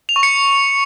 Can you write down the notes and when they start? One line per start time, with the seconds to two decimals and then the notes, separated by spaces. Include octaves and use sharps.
0.09 F7
0.16 C#6
0.23 C#7